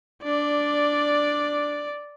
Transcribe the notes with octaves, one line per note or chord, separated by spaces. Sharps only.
D4 D5